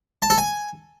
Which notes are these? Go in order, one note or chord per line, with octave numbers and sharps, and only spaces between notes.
A5
A4
G#5